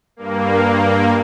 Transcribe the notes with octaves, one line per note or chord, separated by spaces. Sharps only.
G2 A#3